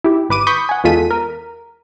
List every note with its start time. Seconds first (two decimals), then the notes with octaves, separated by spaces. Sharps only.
0.04 E4 G4
0.29 G#1 B4 D6 D#7
0.47 B5 C#6 D#6 G6 B6
0.69 F#5 G#5
0.84 E2 G#3 F4 A4 B6 D#7
1.11 A#4